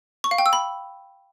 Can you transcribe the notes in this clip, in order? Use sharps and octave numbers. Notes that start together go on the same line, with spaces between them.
C#6
F5
G5
E6
B5